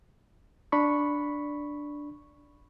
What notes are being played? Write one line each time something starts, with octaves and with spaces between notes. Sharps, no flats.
D4 B5 C#6